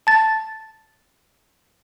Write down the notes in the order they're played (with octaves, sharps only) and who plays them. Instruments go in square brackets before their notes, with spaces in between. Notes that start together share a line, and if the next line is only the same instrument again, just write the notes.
[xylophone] A5 A6